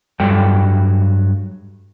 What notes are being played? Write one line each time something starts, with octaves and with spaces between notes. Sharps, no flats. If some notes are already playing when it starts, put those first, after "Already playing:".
G2 F#3 G3 A4 G5